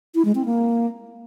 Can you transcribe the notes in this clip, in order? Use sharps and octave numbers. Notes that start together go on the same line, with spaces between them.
E4
G#3
C4
A#3